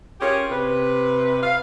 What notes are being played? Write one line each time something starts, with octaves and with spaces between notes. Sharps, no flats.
C#4 F4 G4 G#4 A#4
C3 B4
F5